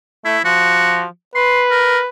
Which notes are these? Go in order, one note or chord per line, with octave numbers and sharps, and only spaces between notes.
A3 E4
F3 F#4
B4 C6
A#4